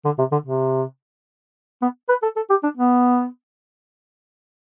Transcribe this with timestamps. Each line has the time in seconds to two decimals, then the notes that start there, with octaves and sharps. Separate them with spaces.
0.05 D3
0.18 C3
0.32 D3
0.46 C3
1.82 B3
2.09 B4
2.23 A4
2.36 A4
2.50 G4
2.63 D4
2.77 B3